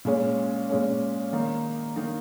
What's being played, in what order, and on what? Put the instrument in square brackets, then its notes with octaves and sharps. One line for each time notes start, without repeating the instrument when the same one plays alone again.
[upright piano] A#2 G#3 C#4
A#2 G#3 C#4
D#3 A#3 D#4
D#3 A#3 D#4